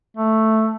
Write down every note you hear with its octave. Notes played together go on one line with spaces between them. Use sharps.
A3